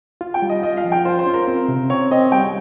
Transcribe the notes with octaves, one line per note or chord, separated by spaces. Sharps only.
F4
G5
G3
D#5
F4 D#5
F5
F3
G5
F4 C5
C5
C#4
A#4
C4
C3
C4 C#5
C4 D#5
G3 G5